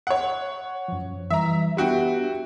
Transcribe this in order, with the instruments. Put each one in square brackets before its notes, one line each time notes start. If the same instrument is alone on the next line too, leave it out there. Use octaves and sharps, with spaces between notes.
[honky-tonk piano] C#5 F#5
[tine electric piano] F#2 F3
[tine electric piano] E3 G3 [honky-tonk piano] E5 A#5
[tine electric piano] B3 D4 G4 [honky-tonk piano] E4 F#4 G5